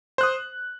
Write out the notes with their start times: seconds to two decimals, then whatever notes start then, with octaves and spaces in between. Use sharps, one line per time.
0.18 C5
0.21 F#6
0.23 D#6